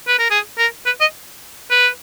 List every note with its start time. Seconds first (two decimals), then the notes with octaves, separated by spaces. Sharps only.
0.08 B4
0.19 A#4
0.31 G#4
0.58 A#4
0.86 B4
1.01 D#5
1.71 B4